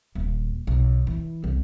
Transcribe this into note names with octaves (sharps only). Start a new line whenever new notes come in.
D#1
B1
E3
C2